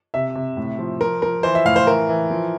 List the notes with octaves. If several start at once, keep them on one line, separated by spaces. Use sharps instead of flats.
C3 E5
C3
A2
F3
F3 A#4
F3 A#4
E3 C5
E5
A2 F5
C5
E3 A#4
E3
F3